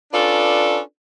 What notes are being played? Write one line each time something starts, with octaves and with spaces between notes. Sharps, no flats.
C#4 D4 F4 A4 B4 D5